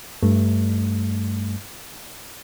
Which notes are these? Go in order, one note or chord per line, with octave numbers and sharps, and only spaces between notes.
G2 G3 A3